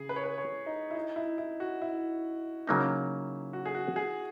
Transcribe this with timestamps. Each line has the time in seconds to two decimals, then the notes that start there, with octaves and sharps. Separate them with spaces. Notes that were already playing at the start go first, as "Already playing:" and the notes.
Already playing: C#3 G#4
0.09 B4
0.16 C#5
0.24 B4
0.38 C#5
0.66 D#4
0.91 E4
0.95 D#4
1.16 E4
1.38 E4
1.60 F#4
1.82 E4
2.67 C#3 F#3 A#3 D#4
3.53 F#4
3.65 G#4
3.75 F#4
3.96 G#4